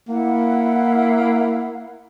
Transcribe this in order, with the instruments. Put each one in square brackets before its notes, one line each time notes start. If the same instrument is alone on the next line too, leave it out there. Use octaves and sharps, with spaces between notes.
[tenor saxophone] A#3 [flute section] E4 F#5